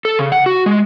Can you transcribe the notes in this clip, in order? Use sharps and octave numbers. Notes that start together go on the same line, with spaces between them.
A4
C#3
F#5
F#4
G#3